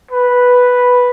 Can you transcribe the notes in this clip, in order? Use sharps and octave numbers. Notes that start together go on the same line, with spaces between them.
B4